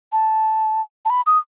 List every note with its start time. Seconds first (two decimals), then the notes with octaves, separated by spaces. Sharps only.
0.12 A5
1.05 A5
1.10 B5
1.27 D#6